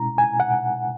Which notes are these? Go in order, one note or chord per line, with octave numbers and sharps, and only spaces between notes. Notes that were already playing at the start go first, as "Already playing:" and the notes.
Already playing: B2 G#3 C#4 E4 A#5
G#5
F#5